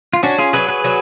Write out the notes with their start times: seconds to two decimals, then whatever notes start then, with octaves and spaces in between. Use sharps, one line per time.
0.13 F4
0.23 C#4 D4 F#4
0.38 F4 G#4
0.53 F#3 G#4 B4
0.69 G#4 B4
0.84 F#3